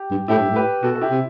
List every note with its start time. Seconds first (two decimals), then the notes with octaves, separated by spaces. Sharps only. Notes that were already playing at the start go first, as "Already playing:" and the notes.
Already playing: G4
0.11 G2
0.28 A2 E4 G4
0.39 G2
0.51 A2
0.56 G4 B4
0.83 B2 F#4 A4
0.95 A4
1.01 E4 G4
1.11 C3